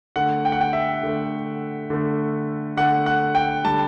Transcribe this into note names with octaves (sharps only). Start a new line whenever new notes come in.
D3 A3 F#5
G5
F#5
G5
E5
D3 A3
D3 A3
D3 A3 F#5
F#5
G5
D3 G3 A5